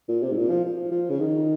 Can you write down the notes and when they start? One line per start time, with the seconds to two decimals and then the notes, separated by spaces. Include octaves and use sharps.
0.09 A#2
0.23 C3
0.32 G#2
0.37 A#2
0.50 F3
0.65 F3
0.92 F3
1.10 C#3
1.20 D#3